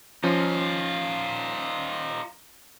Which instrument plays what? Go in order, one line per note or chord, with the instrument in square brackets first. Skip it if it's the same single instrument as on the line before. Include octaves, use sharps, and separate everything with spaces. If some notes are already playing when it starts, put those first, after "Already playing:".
[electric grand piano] F3 C#4 [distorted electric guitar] D#4 F4